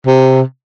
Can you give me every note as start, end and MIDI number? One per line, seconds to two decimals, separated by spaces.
0.07 0.42 48